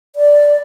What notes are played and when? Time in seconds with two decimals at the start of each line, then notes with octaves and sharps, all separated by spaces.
0.16 D5